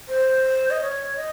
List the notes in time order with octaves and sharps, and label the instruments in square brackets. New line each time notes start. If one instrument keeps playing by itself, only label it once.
[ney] C5
D#5
C#5
D#5